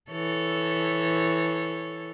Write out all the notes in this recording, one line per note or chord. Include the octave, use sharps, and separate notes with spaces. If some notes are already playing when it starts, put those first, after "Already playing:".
E3 A4 C#5